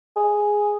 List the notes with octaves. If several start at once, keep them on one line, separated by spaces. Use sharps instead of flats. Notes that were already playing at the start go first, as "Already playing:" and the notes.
G#4